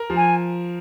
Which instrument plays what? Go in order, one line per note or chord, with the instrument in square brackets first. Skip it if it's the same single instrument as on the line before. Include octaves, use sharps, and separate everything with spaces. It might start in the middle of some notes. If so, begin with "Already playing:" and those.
Already playing: [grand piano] A#4
F3
[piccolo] G#5